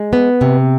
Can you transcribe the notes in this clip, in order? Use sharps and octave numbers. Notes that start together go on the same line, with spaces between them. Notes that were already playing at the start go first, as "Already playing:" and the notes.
Already playing: G#3
B3
C3